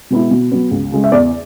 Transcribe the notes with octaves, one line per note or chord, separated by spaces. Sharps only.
B2 G#3 B3 E4
B2
F#3 B3
C#2
C#3 G#3
E5
E2 D5